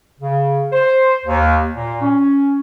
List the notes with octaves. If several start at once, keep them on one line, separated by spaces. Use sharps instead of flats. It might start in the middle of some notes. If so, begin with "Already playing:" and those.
C#3
C5
D#2
A#2
C#4